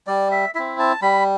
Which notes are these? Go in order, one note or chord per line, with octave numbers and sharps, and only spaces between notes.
G3 D5
E5
C4 E4 E5
A5
G3 B5